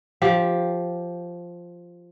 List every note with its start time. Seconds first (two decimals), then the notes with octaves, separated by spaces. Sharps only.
0.22 F3 G4